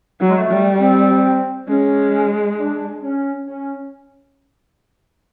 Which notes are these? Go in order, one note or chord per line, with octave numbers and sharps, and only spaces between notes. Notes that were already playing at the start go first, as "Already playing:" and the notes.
F#3
G#3
A3
G3
C4
G#3 C#4
D4
C#4
C#4